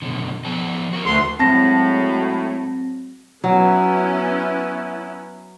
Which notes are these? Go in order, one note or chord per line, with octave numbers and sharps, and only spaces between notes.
F#2 B2 D3
F3 B3 A5
F#4 A#4
D2 C6
A2 F#3 G#3 C4 A5 A#6
F#3 B3 C#4 E4